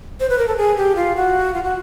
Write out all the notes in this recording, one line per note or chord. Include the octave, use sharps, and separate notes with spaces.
C5
B4
A#4
A4
G#4
G4
F4
F#4
F4
F#4